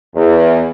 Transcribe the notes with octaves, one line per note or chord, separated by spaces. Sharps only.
E2